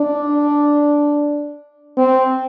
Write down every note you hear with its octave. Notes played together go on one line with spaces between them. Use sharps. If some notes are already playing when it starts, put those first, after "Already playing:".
Already playing: D4
C4